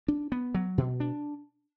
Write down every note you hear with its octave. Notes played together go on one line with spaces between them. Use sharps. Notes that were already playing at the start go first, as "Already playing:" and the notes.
D4
B3
F#3
B2
D4